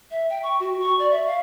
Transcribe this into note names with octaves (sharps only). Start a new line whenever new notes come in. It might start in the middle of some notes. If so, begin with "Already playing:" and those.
E5
G5
C#6
F#4
C#6
D5
E5
F5